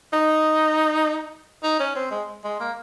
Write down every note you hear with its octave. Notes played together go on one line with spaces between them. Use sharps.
D#4
D#4
C#4
C4
G#3
G#3
A#3